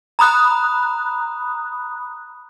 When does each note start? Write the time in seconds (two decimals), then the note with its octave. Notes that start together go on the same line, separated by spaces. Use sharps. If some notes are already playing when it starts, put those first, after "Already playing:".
0.19 A#5 B5 D#6 F#6